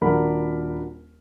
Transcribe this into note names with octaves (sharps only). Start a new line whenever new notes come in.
D#1 D#2 D4 F#4 A#4 B5